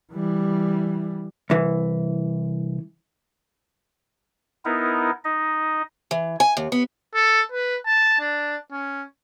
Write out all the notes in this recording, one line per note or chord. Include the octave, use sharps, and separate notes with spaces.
E3 G3
C2 E3
B3 D#4 E4 A#4
D#4 D#5
E3
G#5
D#2
B3
A4
B4
A5
D4
C#4